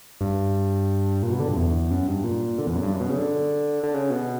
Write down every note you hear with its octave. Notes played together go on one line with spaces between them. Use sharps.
G2
A#2
B2
D3
G2
E2
F#2
G2
A#2
D3
E2
F#2
G2
F#2
B2
C#3
D3
D3
C#3
B2